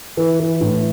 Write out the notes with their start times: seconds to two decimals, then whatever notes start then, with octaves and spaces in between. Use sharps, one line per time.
0.17 E3
0.40 E3
0.61 A2